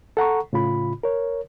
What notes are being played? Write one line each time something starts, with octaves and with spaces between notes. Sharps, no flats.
A4 F#5 A#5 C#6
A2 C#3 F4 B5
A#4 C#5